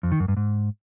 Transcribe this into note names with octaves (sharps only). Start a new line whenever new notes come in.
F2
D#3
F#2
G2
G#2